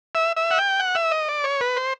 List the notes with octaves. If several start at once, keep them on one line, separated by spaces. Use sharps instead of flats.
E5
E5
F#5
G5
F#5
E5
D#5
D5
C#5
B4
C5